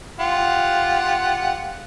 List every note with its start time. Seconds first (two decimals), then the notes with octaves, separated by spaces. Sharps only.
0.20 F4 G4 F#5